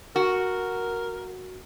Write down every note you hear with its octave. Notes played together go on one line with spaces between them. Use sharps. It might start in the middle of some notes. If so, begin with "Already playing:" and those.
F#4 A#4